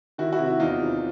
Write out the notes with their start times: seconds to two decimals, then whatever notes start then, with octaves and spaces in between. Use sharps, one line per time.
0.18 D#3 E4 F#4
0.32 E4 F#4
0.39 C3
0.46 E4
0.60 E2 D#4 F4
0.80 C3